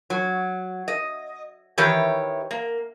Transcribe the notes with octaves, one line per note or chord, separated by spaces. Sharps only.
F#3
D#5
D#3 E3 G4 C#5
A#3